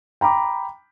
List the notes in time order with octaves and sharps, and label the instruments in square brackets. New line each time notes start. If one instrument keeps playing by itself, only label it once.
[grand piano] G5 A#5 B5 D6